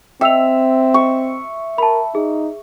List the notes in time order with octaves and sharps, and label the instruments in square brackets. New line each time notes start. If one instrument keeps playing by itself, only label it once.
[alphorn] C4 [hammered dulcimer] E5 [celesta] G5 E6 F7
[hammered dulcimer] C#6
[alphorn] A#4 [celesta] A5 B5
[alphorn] D#4 [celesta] G#4